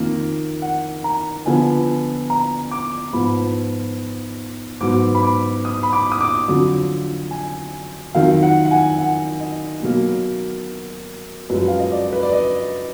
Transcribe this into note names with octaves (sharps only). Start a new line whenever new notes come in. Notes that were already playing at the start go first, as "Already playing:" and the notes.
Already playing: F2 D#3 A#3
F#5
A#5
D3 F3 B3 G#5
A#5
D6
G#2 F3 B3 B5
G#2 F#3 B3 D6
B5
D6
D#6
B5
D6
D#6
D6
F2 D3 F#3
G#5
F2 D#3 F#3 F5
F#5
F#5
G#5
F#5
D#5
B2 F#3 A#3
F#2 F3 G#3 B4
F5
D#5
D5
B4
D5
D#5